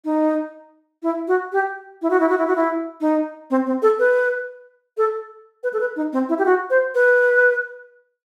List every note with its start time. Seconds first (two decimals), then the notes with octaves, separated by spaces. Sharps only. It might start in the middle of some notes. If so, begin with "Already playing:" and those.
0.05 D#4
1.03 E4
1.28 F#4
1.52 G4
2.02 E4
2.10 F#4
2.20 E4
2.29 F#4
2.38 E4
2.47 F#4
2.56 E4
3.01 D#4
3.50 C4
3.66 C4
3.82 A4
3.99 B4
4.97 A4
5.63 B4
5.73 A4
5.80 B4
5.96 D#4
6.13 C4
6.29 E4
6.38 G4
6.45 F#4
6.70 C5
6.95 B4